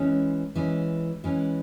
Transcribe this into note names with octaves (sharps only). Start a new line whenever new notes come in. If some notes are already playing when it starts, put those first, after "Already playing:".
Already playing: E3 G#3 C#4
E3 G#3 C#4
E3 G#3 C#4